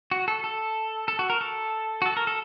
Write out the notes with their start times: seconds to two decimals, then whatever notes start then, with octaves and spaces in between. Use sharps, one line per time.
0.11 F#4
0.28 A4
0.44 A4
1.08 A4
1.19 F#4
1.30 A#4
1.41 A4
2.02 F#4
2.06 A4
2.17 A#4
2.27 A4